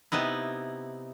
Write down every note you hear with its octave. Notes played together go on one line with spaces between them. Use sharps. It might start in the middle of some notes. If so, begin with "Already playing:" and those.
C3 B3 D#4 E4